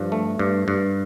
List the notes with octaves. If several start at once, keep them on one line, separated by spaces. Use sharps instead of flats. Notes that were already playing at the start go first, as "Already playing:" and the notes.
Already playing: G2 F3
A3
G2
G2